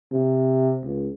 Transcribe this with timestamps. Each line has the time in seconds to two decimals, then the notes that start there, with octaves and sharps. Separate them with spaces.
0.12 C3
0.84 C#2